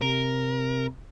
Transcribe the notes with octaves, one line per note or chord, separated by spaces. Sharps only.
C3 A#4